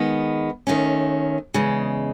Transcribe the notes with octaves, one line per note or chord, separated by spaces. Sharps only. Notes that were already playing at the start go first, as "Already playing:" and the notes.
Already playing: D#3 G#3 B3
D#2 D#3 A3 C#4
E2 C#3 G#3